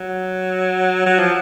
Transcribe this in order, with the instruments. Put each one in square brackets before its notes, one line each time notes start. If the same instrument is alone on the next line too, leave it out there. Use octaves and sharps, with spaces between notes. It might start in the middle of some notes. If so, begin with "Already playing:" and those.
Already playing: [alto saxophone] F#3
F#3
F3